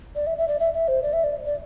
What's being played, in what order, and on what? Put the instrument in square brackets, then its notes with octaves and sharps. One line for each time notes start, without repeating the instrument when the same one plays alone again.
[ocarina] D5
E5
E5
D5
E5
E5
C5
D5
E5
D5
D5